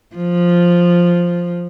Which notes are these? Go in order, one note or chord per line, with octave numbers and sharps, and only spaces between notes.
F3